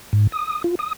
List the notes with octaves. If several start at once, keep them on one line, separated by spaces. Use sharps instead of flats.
G#2
D#6
F4
D#6